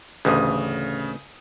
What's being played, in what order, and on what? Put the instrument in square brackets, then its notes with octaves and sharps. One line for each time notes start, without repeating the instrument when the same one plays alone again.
[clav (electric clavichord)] A1 D2 [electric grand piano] C#3 D#6